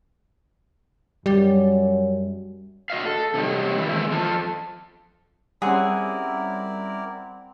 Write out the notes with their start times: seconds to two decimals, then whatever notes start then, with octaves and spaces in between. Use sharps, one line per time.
1.26 F#2 G3
2.90 F#4 D#5 F5
3.05 A4
3.34 C3 F#3 G3 D#4
3.78 D#3 E4
3.89 D#3 G#3 B3 C4 E4
4.10 F2 F3 F4 A4 A5
5.62 G3 C4 C#4 E4 G#4 A#4 D5 F#5